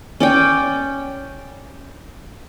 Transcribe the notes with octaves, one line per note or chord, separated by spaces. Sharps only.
C#4 D5 G5